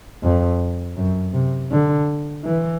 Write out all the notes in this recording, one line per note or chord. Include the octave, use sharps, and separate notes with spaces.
F2
F#2
C3
D3
E3